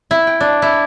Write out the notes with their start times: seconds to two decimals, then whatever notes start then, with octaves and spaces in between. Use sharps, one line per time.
0.11 E4
0.27 G5
0.40 D4
0.62 E4